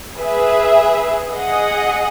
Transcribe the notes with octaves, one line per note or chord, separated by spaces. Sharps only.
G#4 B4 E5
G#4 D#5 F#5